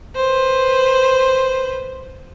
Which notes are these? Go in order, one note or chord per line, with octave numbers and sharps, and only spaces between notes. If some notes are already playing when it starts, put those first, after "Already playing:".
B4 C5